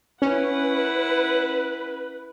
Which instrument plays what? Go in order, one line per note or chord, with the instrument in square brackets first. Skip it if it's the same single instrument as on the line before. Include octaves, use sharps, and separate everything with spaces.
[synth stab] C#4 [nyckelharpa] E4 F#5 [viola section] B4